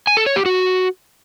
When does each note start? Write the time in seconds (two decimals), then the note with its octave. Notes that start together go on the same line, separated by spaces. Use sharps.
0.07 G#5
0.17 A4
0.26 C#5
0.36 G4
0.46 F#4